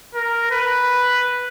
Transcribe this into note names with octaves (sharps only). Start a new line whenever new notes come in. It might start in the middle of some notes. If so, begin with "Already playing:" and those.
A#4
B4